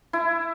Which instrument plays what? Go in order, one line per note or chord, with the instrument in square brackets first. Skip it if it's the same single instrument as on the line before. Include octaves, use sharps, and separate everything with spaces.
[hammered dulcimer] E4